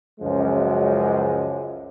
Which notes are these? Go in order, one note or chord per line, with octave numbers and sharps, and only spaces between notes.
C#2 F#2 F3 F#3 G#3